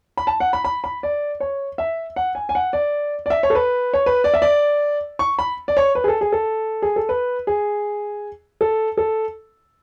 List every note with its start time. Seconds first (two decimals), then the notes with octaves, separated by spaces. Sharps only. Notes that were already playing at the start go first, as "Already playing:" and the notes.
0.17 B5
0.27 A5
0.40 F#5
0.53 B5
0.65 B5
0.84 B5
1.03 D5
1.40 C#5
1.78 E5
2.16 F#5
2.35 G#5
2.49 G#5
2.55 F#5
2.73 D5
3.26 D5
3.30 E5
3.43 C#5
3.50 A4
3.55 B4
3.93 C#5
4.06 B4
4.24 D5
4.34 E5
4.42 D5
5.19 C#6
5.39 B5
5.68 D5
5.77 C#5
5.95 B4
6.04 G#4
6.08 A4
6.21 G#4
6.32 A4
6.82 G#4
6.96 A4
7.09 B4
7.47 G#4
8.61 A4
8.97 A4